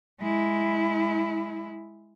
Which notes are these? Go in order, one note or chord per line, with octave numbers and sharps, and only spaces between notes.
G#3 E4